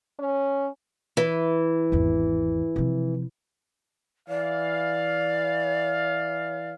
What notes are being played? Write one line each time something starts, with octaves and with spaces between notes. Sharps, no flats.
C#4
E3
G#1 E2
C3 F3
E3 D5 F5